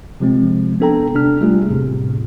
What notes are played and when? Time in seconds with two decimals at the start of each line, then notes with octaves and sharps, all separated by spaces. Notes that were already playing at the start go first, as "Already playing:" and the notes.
0.20 C3 F3 G#3 C4
0.80 B3 D4 A4 G5 A#5
1.15 C3 D4 F6
1.41 G3 A3 F4 G#4
1.69 E2 A2 C3